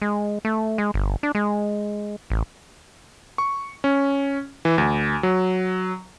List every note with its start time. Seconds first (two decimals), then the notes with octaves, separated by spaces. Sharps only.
0.02 G#3
0.45 A3
0.78 G#3
0.94 G1
1.23 D4
1.35 G#3
2.30 A1
3.38 C#6
3.84 C#4
4.65 E3
4.78 D2
5.23 F#3